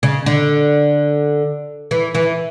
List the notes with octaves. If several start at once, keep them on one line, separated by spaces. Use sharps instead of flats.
C#3
D3
E3
E3